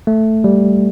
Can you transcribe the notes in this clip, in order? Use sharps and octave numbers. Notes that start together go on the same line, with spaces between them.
A3
G3